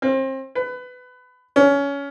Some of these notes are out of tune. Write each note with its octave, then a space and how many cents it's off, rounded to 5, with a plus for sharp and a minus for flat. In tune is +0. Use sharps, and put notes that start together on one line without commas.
C4 +30
B4 +20
C#4 +20